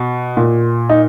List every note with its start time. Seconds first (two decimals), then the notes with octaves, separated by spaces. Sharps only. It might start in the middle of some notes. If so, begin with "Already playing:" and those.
Already playing: B2
0.37 A#2
0.89 D#4